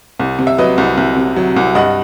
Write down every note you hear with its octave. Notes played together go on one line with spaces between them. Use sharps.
C2
C3
E5
F#3 B4 D#5
C2
C2
C3
F#3
C2
G2 D#5 F#5